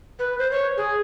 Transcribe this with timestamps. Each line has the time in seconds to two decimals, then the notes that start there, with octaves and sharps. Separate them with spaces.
0.19 B4
0.39 C5
0.51 C#5
0.77 G#4